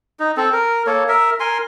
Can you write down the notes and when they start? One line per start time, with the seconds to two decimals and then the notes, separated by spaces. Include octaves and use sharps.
0.20 D#4
0.37 C4 A4
0.53 A#4
0.87 A#3 A4 C#5
1.09 A#4 E5
1.40 A#4 G#5 C6